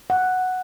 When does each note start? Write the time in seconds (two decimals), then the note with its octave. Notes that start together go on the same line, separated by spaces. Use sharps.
0.10 F#5